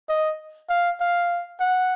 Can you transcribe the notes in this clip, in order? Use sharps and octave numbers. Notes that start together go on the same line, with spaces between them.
D#5
F5
F5
F#5